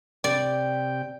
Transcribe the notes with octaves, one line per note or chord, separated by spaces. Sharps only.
C3 D5 G5